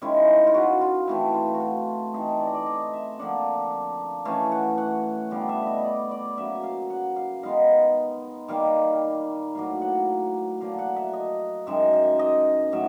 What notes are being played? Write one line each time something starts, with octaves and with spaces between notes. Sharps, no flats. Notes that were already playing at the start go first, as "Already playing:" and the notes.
D#3 G#3 C#4 E4 F4
F4
F#4
F4
E3 A3 C4 E4
F4
F#4
F4
E3 A3 C4 D#4 G#4
D5
D#5
D5
D#5
E5
D3 F3 A#3 D4 F#5
E3 A3 C#4 F5
F#5
F#5
D3 G3 B3 F5
E5
D#5 E5
D5
D5
C#3 F#3 A#3 E5
F5
F#5
F5
D#3 G#3 B3 D#4 F5
D#3 G3 A#3 F5
A2 F#3 A#3 F5
F#5
D3 F#3 A#3 F5
F#5
E5
D#5
F#2 D#3 G#3 E5
E5
D#5
A2 F#3 E5